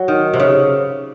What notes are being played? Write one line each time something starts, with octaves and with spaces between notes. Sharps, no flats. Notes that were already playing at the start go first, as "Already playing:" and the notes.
Already playing: F#3
D#3
C3
C#3